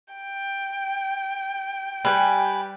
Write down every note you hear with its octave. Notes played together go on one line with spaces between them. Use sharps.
G5
G3 B4 G#5